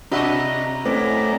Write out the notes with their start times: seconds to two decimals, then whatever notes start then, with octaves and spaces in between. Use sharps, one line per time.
0.12 C3 D4 F#4 B4 D#5 E5 A#5
0.85 F#2 A3 C4 E4 B4 D5 A#5